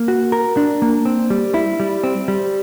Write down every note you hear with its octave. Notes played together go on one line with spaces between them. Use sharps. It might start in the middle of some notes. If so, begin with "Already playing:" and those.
Already playing: A#3
F#4
A#4
D4
A#3
C4
G3
E4
G3
C4
G3